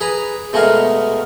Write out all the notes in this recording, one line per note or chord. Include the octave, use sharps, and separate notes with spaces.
G#4 B4 A#5
B2 G#3 A3 F#4 A#4 F5